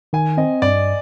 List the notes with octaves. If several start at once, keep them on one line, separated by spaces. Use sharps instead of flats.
D#3 G#5
C4 D#5
G2 D5